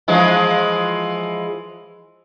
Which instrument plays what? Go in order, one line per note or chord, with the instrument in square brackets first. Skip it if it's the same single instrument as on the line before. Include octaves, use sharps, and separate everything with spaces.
[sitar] E3 F3 G#3